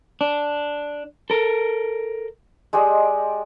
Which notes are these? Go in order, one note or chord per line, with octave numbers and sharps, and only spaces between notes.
D4
A4 A#4
G#3 G4 D5 D#5